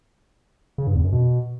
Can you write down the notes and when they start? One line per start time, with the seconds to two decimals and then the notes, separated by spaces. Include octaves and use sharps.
0.78 C#3
0.87 G2
0.95 E2
1.04 F#2
1.12 B2